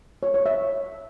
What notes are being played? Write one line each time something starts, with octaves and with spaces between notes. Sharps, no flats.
C#5
C#5
E5